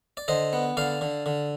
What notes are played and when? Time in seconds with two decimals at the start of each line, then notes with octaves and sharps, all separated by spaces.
0.17 D5
0.28 D3 C5 D#5
0.53 B3
0.77 D3 D5 F5
1.01 D3
1.26 D3